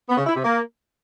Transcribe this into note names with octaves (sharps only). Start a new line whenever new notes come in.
B3
C#3
E4
C3
A#3